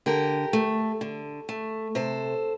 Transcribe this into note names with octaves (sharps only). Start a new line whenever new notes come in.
D3 G4 A#4
A3
D3
A3
C3 A4 C5